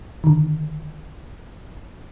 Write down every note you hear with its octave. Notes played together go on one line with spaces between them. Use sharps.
D3 D#3